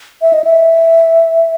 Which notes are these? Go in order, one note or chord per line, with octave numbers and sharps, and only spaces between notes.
E5
D#5
E5